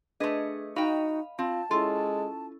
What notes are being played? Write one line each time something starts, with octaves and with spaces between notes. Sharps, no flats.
A3 D4 G#4 B4 D#5
D#4 F#4 D#5 F5 G5 B5
C4 F4 A5
G#3 C#4 E4 F4 A4